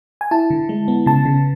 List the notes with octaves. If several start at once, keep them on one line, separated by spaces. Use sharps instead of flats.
G#5
E4 A5
D3
G#3
B3
C#3 A5
C#3